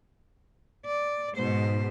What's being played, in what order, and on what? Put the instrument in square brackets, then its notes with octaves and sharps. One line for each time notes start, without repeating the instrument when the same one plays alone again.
[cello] D5
[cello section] G#2 [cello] B2 C5